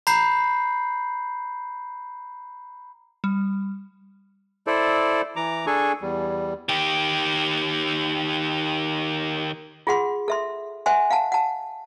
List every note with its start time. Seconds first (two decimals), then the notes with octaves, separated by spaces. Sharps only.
0.07 A#5 B5 G6 C7
3.24 G3
4.67 E4 A4 C5 D5
5.36 E3 A#5 D6
5.66 D4 G#4 A4 G#5 C#6
6.01 E2 G3
6.69 D#3 G4
9.87 F4 G#4 F#5 C6
10.28 A4 E5 C6
10.86 C5 E5 F#5 G#5 C6
11.10 F5 F#5 A5
11.32 F#5 A5